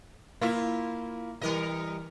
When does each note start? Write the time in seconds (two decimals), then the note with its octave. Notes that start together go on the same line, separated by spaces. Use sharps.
0.41 A#3 E4 F4 E5
1.41 E3 G3 A#4 D#5